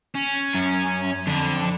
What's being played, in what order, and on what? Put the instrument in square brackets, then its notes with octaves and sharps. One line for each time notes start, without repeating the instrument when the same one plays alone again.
[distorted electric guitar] C#4
[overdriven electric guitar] F#2
[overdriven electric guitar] F2 [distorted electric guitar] D3